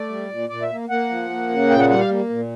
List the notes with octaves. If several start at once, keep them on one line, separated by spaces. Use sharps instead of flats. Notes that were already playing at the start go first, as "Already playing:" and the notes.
Already playing: A3 D5
G3
A#2
A#2 D5
E5
A#3
A#3 F#5
F3
A#3
C#3
A#2 G5
F#5
G3 F#5
F5
A#3
A#2